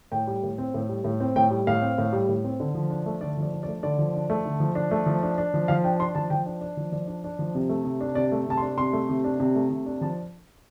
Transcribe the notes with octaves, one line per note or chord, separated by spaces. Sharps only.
A2 G5
G3
A2
C4
A2
G3
A2
C4
A2 G5
G3
A2 F5
C4
A2
G3
A2
C4
D3
F3
D4
A3
D3 D5
F3 D5
D4
D5
A3
D3 D5
F3
D4
A3
D3
F3
D4
A3
F3
D4
D4
F3
F3 F5
D4 G5
D4 C6
F3 A5
F3 G5
D4
D4
F3
F3 D5
D4
D4
F3
C3
A3
C3
D4
C3 D5
A3
C3 A5
C6
D4
C3 C6
A3
C3
D4
C3
A3
C3
D4
F3 A5